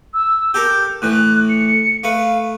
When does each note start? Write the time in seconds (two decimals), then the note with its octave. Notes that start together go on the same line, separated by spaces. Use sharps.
0.14 E6
0.54 G4 A4 A#4 G6
1.02 A2 E3 F#6
1.50 C#7
2.04 A3 B4 F5